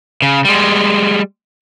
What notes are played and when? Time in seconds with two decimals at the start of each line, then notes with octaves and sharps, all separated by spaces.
0.22 C#3
0.45 G3 G#3